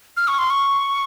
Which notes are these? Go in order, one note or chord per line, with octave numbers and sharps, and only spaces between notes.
F6
C#6
C6
C#6